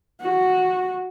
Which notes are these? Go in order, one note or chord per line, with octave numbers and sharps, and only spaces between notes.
F#4